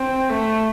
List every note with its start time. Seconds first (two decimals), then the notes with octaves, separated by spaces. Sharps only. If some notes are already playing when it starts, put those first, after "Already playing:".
Already playing: C4
0.30 A3